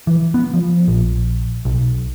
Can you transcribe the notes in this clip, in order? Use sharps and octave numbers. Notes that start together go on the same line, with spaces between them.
E3
B3
F3
A#1
B1